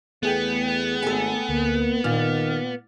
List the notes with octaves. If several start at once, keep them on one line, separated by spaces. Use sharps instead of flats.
E2 A3 B3 G#4 G5
G#1 A4 G#5
D2 A#3
A#2 D#3 F6 A6